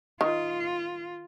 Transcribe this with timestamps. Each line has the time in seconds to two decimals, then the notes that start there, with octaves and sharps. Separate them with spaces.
0.21 D#3 F4